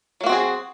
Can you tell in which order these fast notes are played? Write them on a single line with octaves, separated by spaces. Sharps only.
F#3 A#3 F#4 C4 G#4